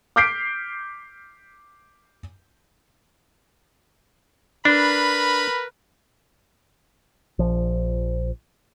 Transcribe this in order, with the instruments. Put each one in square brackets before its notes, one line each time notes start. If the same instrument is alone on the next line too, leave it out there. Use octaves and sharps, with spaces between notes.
[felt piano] D6 F6 G6 B6 C7 D7
[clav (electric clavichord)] D4 [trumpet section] A#4 B4 B5
[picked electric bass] A#1 F3